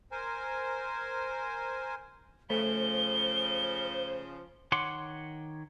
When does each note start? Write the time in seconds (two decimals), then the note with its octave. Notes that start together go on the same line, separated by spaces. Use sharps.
0.12 A#4 C5 G#5
2.50 C#3 F3 A3 C5 G7
4.72 D#3 C#5 F#5 C6 D6